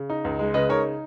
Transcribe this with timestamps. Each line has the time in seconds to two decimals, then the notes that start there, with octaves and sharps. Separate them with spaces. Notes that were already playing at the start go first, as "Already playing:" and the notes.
Already playing: C#3
0.10 D#4
0.24 C#2
0.39 G#3
0.54 C#3 B4 D#5
0.69 D#4 A#4 C#5